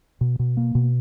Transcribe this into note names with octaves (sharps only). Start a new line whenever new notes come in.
B2
B2
A#3
B2